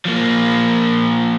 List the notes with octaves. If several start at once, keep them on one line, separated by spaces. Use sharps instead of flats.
F3 A#3